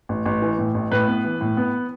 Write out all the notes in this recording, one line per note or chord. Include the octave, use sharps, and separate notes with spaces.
A1
A1
E3
A2
A1
A2 B4
B3
E3
A2
B3